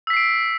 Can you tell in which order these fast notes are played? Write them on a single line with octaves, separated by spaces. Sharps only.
E6 B6 C7 D7